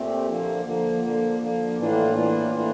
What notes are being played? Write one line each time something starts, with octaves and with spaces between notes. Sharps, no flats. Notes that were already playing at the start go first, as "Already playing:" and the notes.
Already playing: A#2 A3 C4 G4
D3 F3 A#3
D3 F3 A#3
D3 F3 A#3
D3 F3 A#3
A2 E3 A#3 D4 F4
A2 E3 A#3 D4 F4
A2 E3 A#3 D4 F4